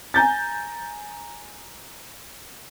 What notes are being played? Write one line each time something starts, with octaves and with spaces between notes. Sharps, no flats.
G#5 A#5 G6 A6